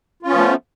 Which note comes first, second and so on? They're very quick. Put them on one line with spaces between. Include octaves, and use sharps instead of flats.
F4 C#4 B3 F3 A3